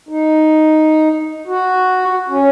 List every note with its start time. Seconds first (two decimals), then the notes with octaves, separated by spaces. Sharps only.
0.09 D#4
1.47 F#4
2.29 C#4